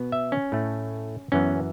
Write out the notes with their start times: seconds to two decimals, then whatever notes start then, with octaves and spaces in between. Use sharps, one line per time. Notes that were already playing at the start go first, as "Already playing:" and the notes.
Already playing: B2 B3
0.12 E5
0.32 C#4
0.52 A2 A3
1.32 F#2 E3 B3 C#4